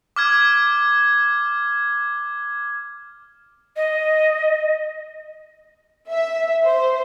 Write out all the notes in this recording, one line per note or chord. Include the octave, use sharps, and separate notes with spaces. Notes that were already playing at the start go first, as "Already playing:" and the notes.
D6 F6 G#6
D#5
E5
C5